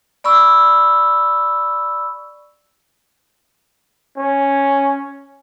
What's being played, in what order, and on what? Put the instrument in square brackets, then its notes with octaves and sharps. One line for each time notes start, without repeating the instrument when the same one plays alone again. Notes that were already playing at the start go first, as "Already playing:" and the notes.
[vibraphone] D5 B5 C#6 E6
[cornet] C#4